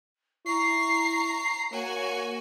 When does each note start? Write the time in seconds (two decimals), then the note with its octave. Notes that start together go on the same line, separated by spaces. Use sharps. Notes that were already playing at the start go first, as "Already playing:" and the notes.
0.46 E4 A#5 C#6 C7
1.72 A#3 F#4 C#5 G#5